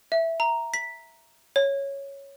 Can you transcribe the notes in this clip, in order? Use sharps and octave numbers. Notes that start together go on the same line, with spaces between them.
E5
A#5
B6
C#5